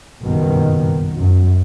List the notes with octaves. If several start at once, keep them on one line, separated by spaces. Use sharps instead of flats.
F#1 B1 G2 B2 D#3
F#2